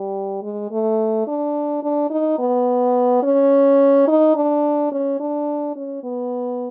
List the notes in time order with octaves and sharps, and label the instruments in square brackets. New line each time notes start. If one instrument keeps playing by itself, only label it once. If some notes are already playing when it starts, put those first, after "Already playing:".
Already playing: [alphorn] G3
G#3
A3
D4
D4
D#4
B3
C#4
D#4
D4
C#4
D4
C#4
B3